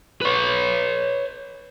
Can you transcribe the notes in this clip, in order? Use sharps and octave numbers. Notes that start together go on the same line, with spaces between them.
B4 C#5